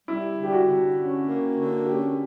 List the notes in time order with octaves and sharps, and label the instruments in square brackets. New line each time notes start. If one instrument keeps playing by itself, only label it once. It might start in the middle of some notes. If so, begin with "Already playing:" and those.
[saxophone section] G3 [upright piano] E4
[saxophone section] D3
[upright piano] G4
F#4
[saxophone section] D3
C#4
A#3
D3
[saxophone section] C#4 [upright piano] G4